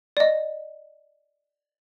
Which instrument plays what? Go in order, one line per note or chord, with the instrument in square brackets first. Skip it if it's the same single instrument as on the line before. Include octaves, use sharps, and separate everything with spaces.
[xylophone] D5 D#5